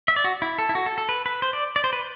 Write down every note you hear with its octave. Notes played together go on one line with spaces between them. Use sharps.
E5
D5
F#4
E4
A4
E4
F#4
A4
A4
B4
B4
C5
D5
D5
C5
B4